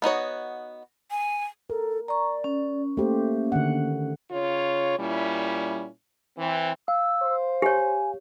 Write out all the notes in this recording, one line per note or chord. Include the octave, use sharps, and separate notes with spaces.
B3 D#4 F#4 C#5
G#5
A4 A#4
D5 A#5 C#6
C#4
A3 A#3 G4 C5
D3 D#3 F#5
C#3 F4 C#5
A#2 G3 C#4 E4
E3 C4
F5 E6
C5
G4 C#5 G#5